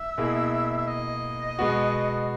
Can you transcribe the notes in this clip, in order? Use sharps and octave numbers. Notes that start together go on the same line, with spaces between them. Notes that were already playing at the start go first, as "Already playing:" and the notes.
Already playing: E5
B2 A#3 E4 G#4
E5
D#5
B2 G#3 B3 F#4